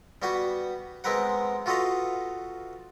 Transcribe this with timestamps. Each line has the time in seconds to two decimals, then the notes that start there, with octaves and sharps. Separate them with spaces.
0.22 G3 B3 F#4 B4 F#5
1.04 G#3 B3 C4 A#4 B4 F#5
1.66 F4 F#4 A4 B4 D#5 F5